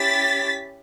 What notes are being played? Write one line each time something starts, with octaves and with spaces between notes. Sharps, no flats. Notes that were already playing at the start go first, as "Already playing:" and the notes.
Already playing: C#4 E4 G4 A6 B6